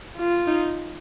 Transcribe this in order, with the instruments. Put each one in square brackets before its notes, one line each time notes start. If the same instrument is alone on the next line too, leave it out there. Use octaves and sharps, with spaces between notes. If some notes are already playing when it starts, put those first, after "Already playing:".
[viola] F4
[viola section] D#4